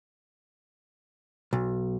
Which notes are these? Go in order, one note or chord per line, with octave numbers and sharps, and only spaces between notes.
B1